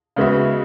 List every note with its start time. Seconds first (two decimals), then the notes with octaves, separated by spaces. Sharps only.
0.16 C#3 G#3 B3 F#4 E5